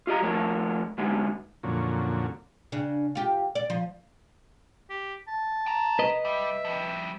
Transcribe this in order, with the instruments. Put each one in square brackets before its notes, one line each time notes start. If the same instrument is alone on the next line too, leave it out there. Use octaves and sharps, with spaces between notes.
[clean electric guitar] F4 G4 D#5 A#5
F3 A3 F4 A4 A#4 C#5
D3 G3 G#3 B3 D#4
[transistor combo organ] F2 A#2 D3 F#3 C#4
[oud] C#3 D4
F4 G4
D5
F3
[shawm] G4
A5
[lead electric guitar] G5 A#5
[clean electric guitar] B4 D#5
[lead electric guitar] G3 [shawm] E5
[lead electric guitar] F3 G3